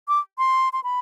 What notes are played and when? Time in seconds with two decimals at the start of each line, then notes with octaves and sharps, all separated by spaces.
0.08 D6
0.38 C6
0.73 C6
0.84 B5